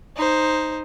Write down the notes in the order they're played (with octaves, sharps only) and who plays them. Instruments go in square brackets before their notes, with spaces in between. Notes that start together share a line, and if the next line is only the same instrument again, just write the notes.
[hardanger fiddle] D#4 C5